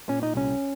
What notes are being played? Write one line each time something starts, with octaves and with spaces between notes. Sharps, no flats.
A#2 C#4
D#4
C2 C#4